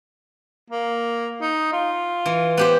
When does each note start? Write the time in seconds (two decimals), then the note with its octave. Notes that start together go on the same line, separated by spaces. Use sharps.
0.70 A#3
1.42 D#4
1.73 F4
2.26 E3
2.57 B3 G4 C5